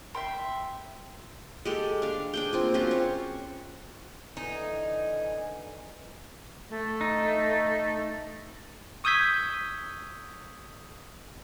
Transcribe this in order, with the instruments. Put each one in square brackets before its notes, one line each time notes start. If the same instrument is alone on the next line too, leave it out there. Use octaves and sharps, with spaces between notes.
[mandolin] E5 G5 C6
[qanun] G#3 G4 A4
D4 F5
D4 G#4 G5
A#3 C4 F4
C4 C#4 F4 F#4
C#5
[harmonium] D3 E3 G#5 [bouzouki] D#4
[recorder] A3
[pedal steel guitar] D#4
[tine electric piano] C#6 D#6 E6 G6 G#6 B6